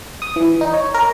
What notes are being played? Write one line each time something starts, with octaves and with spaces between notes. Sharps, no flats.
D#6
E3
D#4
C#5
A#4